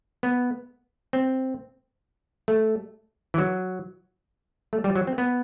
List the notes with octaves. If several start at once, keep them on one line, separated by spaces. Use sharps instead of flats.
B3
C4
A3
E3
F#3
A3
G3
F#3
C4
B3